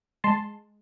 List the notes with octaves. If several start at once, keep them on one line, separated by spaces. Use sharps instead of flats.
G#3 A5 C6